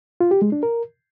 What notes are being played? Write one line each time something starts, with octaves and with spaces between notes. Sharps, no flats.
F4
G4
G#3
D4
A#4